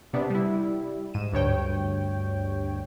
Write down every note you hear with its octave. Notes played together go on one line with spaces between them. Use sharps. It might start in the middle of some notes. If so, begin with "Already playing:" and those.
C3 B3 D4
G3 E4
G#2 D#7 E7
D2 G2 C#5 G5